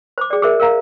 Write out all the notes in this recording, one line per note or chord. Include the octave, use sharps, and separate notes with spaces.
C5 D6
G#4 D5
G#4 A#4 C5 E5
A#4 F5 A#5